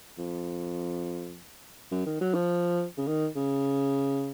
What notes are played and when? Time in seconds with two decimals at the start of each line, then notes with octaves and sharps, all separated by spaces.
0.18 F2
1.91 F#2
2.06 D#3
2.21 F#3
2.34 F3
2.97 C#3
3.07 D#3
3.36 C#3